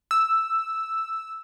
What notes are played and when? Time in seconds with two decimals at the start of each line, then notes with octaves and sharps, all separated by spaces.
0.11 E6